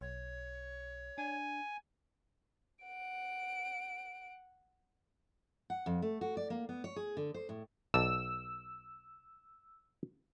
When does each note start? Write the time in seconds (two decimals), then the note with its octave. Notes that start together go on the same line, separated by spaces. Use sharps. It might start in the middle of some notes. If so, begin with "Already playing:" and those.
0.01 B1 C#5
1.18 D4 G#5
2.83 F#5 D7
5.70 F#5
5.86 F2
6.02 A3
6.21 F#4
6.37 D5
6.50 A#3
6.69 B3
6.84 C#5
6.96 G#4
7.17 D3
7.34 C5
7.49 A2
7.94 B1 D5 A5 E6